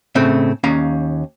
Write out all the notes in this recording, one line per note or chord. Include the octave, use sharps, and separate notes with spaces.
A2 C#3 A3 C4
D#2 C#4 F5 A#5